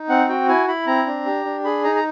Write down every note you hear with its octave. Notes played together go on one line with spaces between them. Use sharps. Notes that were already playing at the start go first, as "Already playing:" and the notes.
Already playing: D#4
C4 F#5
F#4 G5
E4 G#5
E4 B5
C4 A#5
D4
G4
D4
G#4 B5
D#4 A#5
A#5